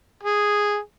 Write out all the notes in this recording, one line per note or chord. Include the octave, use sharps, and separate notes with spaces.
G#4